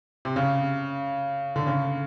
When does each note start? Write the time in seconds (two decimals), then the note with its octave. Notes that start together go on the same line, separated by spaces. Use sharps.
0.25 C3
0.36 C#3
1.56 D3
1.66 C#3